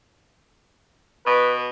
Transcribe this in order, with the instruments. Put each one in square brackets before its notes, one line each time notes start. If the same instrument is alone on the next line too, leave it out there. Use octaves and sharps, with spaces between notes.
[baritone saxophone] B2 [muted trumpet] B4